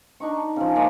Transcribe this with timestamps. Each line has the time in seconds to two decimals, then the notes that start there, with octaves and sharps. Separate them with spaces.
0.20 D4 D#4 C#6
0.56 C#3 F3
0.75 G#3 A#3 C#4 A#4